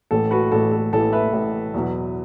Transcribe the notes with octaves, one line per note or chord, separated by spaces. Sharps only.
A1 A2 E3 A4
F#4 B4
A1 A2 E3 A4
A4
A1 A2 E3 A4
B4 E5
A1 A2 E3
E2 B2 F#3